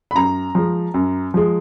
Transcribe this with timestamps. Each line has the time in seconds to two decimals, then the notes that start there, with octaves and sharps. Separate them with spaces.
0.11 B5
0.15 F#2 A#5
0.55 F3 G#3
0.94 F#2
1.34 F3 G#3